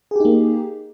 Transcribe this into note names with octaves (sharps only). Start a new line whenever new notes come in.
A#3 D#4 G4 G#4